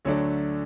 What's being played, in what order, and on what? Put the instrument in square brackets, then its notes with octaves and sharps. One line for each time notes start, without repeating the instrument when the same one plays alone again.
[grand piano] D2 D3 F#3 A3 D4 C#5